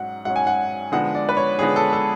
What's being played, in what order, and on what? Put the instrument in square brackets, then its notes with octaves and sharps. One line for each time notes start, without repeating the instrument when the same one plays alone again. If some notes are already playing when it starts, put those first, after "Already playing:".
Already playing: [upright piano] G#2 F#3 C#4 F#5
G#2 F#3 C#4 F#5
G#5
F#5
D3 F3 G#3 B3 F#5
D5
B4
C#5
D3 F3 G#3 B3 G#4
A4
A4